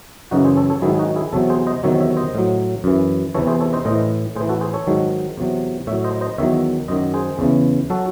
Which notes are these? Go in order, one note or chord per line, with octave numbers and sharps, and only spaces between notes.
F#2 C#3 E3 D#4 F#4
G#4 C5
A4 C#5
A4 C#5
G#2 D#3 F#3 E4 G#4
G#4
D#4 F#4
E4 G#4
E2 C3 F#3 A4 C#5
G#4 C5
C5 D#5
E2 C3 D#3 F#3 C#5 E5
C#5 E5
C5 D#5
A2 F#3
F#2 E3
E2 C3 E3 A4 C#5
G#4 C5
A4 C#5
C5 D#5
A2 E3 C5 D#5
A2 E3 G#4 C5
F#4 A4
G#4 C5
A4 C#5
G#2 D#3 F#3
E2 C3 F#3
A2 F#3 C#5 E5
C5 D#5
C5 D#5
E2 D#3 F#3 C#5 E5
F#2 D#3 F#3 C5 D#5
G#4 C5
E2 C#3 E3
F#3 F#4 A4